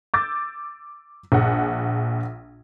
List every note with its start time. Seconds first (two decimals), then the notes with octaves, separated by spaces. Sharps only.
0.14 D6 E6 G6 A6
1.32 A#1 G#4 F#5